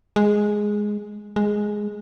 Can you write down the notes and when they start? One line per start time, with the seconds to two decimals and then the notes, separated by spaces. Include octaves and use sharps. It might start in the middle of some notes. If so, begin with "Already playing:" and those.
0.16 G#3
1.36 G#3